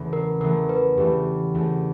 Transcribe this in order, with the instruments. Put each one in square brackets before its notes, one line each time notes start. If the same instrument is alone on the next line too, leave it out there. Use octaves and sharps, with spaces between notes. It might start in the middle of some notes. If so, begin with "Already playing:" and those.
Already playing: [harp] E2 C#3 E3 A3
[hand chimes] A#4
[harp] E2 C#3 E3 A3 [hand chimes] A#4
[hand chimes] B4
[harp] E2 C#3 E3 A3 [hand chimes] G4
[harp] E2 C#3 E3 A3